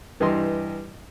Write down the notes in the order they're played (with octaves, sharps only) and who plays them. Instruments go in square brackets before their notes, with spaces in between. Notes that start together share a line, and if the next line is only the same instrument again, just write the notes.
[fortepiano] G2 E3 G4 D#5 C6